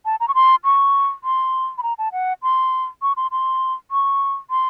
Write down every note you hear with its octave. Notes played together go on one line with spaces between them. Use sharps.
A5
A#5
C#6
C6
C#6
C6
B5
A#5
A5
F#5
C6
C#6
C6
C6
C#6
C6